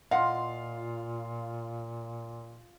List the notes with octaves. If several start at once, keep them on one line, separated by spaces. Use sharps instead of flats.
A#2 F4 D#5 F5 F#5 C6